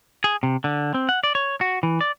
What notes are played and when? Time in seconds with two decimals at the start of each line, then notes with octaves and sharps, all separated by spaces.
0.24 G#4
0.43 C3
0.64 D3
0.94 C4
1.09 F#5
1.24 D5
1.35 C#5
1.61 F#4
1.83 E3
2.01 D5